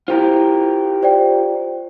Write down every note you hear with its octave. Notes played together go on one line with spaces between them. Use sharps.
E4 F4 G4 A#4 C5
C5 D5 G5